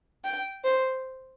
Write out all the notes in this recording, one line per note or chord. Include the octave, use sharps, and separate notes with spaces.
G5
C5